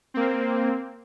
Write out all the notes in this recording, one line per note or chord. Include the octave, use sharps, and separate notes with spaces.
A#3 C4